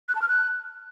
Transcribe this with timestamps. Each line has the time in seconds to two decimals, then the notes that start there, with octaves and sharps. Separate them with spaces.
0.08 F#6
0.15 A5
0.22 F6
0.28 F#6